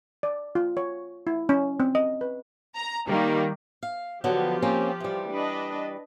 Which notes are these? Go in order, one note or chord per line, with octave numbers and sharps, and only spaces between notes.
D5
F4
C#5
E4
C#4
C4
D#5
B4
A#5
D#3 G3 A#3
F5
D3 F3 F#3 B3 G4
A#3 C4 C#4
E3 G3
D4 B4 D#5